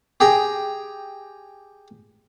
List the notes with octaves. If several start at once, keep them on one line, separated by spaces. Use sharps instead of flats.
G4 G#4 G5 A#5